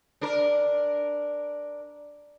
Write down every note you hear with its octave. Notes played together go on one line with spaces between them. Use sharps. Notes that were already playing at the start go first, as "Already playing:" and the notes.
D4 A#4